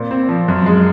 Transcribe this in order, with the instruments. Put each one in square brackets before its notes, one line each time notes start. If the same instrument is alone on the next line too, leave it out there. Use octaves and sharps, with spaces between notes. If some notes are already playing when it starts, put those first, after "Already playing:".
Already playing: [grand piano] A#2 C4
C4
F3
F#2
G#3